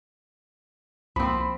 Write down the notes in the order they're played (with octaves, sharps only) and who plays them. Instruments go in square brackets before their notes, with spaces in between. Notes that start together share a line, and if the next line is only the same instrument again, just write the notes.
[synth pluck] C2 A#3 [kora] F3 C4 [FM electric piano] B5